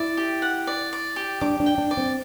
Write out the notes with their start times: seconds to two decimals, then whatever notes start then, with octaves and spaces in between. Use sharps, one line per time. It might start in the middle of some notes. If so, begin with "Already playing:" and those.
Already playing: E4 D5
0.17 G4
0.42 F#5
0.67 D5
0.93 D5
1.16 G4
1.41 D4 D6
1.60 D4
1.66 G5
1.78 D4
1.91 D5
1.97 C4